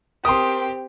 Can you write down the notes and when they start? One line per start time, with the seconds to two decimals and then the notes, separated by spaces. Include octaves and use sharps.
0.25 C4 G4 A#4 C6 D#6